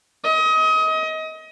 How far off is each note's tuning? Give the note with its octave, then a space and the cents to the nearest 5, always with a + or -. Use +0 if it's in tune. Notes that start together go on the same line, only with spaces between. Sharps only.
D#5 +30